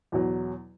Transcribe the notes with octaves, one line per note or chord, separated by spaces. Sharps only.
E2 B2 F#3